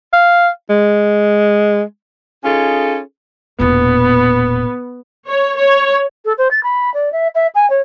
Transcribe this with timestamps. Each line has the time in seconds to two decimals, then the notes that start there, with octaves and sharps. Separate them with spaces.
0.13 F5
0.70 G#3
2.44 C#4 D#4 F4 G#4 A4
3.60 E1 A#2 B3
5.27 C#5
5.58 C#5
6.25 A4
6.38 C5
6.51 A6
6.63 B5
6.94 D5
7.12 E5
7.35 E5
7.55 G#5
7.70 C#5